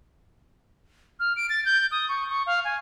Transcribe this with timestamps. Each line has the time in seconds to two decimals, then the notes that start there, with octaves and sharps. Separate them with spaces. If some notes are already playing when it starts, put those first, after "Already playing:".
1.20 F6
1.36 D7
1.50 A6
1.65 G6
1.92 D#6
2.09 C#6
2.30 C#6
2.46 F5
2.65 G#5